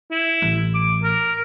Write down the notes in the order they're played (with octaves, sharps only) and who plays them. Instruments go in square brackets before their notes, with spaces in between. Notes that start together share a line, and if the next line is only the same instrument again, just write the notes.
[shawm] E4
[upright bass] A1
[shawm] D6
A#4